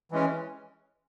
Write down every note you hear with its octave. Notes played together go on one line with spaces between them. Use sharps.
E3 G#3 C#4